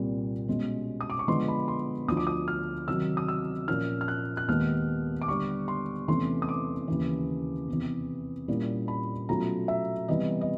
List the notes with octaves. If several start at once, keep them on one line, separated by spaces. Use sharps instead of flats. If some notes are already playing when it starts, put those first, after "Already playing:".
Already playing: C2 A#2 G3 C4
B2 G#3 C#4
D#6
D6
C#6
D3 F3 G#3 B3 C6
B5
C6
D2 D3 F3 D#6
D6
D#6
F6
C3 D#3 F#3 E6
D#6
E6
A#2 F3 A#3 C#4 F6
F6
F#6
F#6
D#2 D#3 G#3 B3 F6
D6
D3 G3 B3 C#6
C6
E2 C3 E3 A3 C#4 C6
D#6
D6
D#2 C#3 E3
E2 C3 E3
A#2 G3 A#3 C#4 E4
B5
B2 F#3 A3 C#4 F4 A#5
E5
C3 E3 G3 B3 D#5
D#5